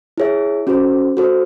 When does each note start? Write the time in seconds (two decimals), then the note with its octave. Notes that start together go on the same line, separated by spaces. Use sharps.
0.18 E4 G#4 C#5 E5
0.67 C#4 F#4 A4 C5
1.17 F#4 A4 C5